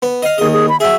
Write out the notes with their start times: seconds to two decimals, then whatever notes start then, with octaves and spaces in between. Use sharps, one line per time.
0.02 B3
0.23 D#5 F5
0.38 D#2 G#4 D#5
0.53 G#4
0.69 B5
0.80 F#3 G#4 E5